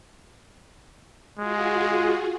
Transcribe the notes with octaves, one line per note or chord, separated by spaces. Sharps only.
G#3 F4 F#4 G#4